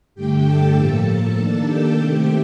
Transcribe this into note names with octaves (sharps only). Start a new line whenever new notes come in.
G2 D3 A3 G4 G5
A4 A5
A2 F3 A#3 A4 A5
D#3 A#3 D4
G4 G5
C3 D#3 A3 C4